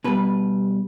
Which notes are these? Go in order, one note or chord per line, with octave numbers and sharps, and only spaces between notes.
B2 G3 B4